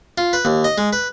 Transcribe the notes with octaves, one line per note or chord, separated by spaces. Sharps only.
F4
B4
D#2
D#5
G#3
B4